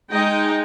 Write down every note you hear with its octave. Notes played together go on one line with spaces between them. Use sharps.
G#3 D#4 D#5 G5